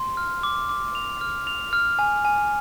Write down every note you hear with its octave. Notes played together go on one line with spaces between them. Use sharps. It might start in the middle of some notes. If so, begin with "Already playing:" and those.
Already playing: C6
F6
D6
D6
F7
F6
F7
F6
G#5
G#5